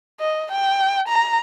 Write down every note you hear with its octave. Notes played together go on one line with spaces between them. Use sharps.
D#5
G5
A#5